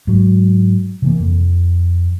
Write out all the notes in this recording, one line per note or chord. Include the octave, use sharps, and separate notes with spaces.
G#2 F#3
C3 E3 A#3
F2